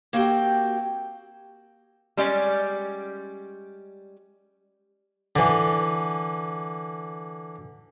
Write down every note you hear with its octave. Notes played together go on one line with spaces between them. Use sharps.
A#3 C4 F#4 G4 G5
G3 G#3 C#4 G4 D5
D3 E3